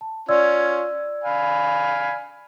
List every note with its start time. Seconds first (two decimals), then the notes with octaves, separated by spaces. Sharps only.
0.01 A5
0.29 C#4 F4 D5 E6 G#6
1.24 F5 G#5 B5